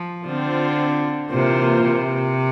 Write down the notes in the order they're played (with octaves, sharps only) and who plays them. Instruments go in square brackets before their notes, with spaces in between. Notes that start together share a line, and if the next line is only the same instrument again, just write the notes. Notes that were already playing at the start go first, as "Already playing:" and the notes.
Already playing: [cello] F3
[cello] D3 [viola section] C4 F4 C5
[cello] C3 [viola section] E3 A#3 F4 C5
[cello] C3